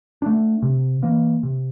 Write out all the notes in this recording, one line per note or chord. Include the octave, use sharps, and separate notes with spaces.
A3 D4
C3
E3 A#3
C3